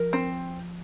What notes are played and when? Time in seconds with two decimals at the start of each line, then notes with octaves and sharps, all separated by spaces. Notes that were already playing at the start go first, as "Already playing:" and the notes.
Already playing: F3 A#4
0.13 C4